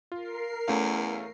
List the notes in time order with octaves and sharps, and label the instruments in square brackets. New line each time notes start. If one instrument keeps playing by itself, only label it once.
[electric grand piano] F4 [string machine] A#4 C7
[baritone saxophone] E2 [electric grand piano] A3 C#4 F5